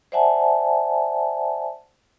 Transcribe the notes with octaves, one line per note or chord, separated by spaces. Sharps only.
C5 D5 E5 F#5 G#5 A5